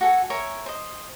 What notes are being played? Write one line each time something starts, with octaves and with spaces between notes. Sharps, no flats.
F#4 A4 G#5
A#4 C#5 E5 G#5
C5 D#5